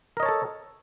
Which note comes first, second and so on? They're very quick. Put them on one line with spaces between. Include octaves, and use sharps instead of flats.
A#4 D#5 C#5 A5 A4